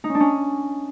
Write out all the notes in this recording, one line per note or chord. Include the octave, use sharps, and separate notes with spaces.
D#4
C#4
D4
C#4